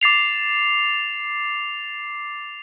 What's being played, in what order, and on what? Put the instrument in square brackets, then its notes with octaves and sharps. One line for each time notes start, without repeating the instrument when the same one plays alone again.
[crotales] D6 A6 C7 F7